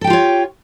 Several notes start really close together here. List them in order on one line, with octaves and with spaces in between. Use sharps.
A4 G5 G4 F4 C#5